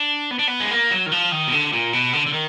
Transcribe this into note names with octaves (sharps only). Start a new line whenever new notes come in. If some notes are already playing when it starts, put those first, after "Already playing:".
Already playing: D4
B3
D4
B3
G#3
A#3
F#3
D#3
F3
D#3
B2
D3
A#2
B2
D3
D3
D#3